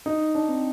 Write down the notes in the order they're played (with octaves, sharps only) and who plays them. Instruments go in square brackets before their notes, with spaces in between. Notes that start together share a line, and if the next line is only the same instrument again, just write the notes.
[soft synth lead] D4 [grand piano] D#4
[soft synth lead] D#4
[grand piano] D4 [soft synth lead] D#4
[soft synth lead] C4